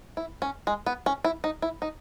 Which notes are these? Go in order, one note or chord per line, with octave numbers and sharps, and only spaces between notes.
E4
C#4
G#3
B3
C#4
E4
D#4
E4
D#4